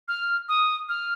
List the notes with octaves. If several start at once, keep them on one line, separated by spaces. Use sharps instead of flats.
F6
D#6
F6